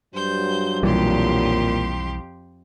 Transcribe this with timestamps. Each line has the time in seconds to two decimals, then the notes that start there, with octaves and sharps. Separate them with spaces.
0.14 G2 F#3 C5 G6
0.83 B1 F2 A#2 E3 G3 G4 C6